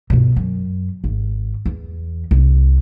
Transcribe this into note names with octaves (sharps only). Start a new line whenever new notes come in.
G2 B2
F#2
G#1
E2
C2 C3